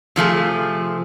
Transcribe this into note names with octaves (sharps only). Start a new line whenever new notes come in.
C3 F3 A3 G#4